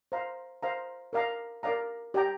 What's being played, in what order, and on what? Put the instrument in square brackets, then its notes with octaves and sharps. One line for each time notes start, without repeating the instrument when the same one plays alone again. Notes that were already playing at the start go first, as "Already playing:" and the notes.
[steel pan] C5 F5 A#5
C5 F5 A#5
A#4 D5 F5 A#5
A#4 D5 F5 A#5
G4 D5 G5 A#5